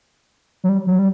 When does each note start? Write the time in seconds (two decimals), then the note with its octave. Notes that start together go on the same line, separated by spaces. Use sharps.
0.64 F#3
0.69 G3
0.87 F#3
0.99 G3